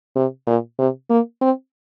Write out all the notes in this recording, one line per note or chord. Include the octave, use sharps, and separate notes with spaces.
C3
A#2
C3
A#3
C4